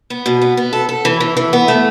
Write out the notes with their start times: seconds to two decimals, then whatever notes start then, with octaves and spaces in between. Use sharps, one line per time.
0.10 B3
0.26 B2
0.41 B3
0.57 B3
0.73 A4
0.89 A4
1.05 E3
1.20 E3
1.37 E3
1.53 B3
1.68 A3